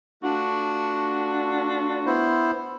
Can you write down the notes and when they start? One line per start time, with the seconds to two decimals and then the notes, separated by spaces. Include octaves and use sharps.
0.23 A3 D4 F4 F#4
2.06 B3 E4 C5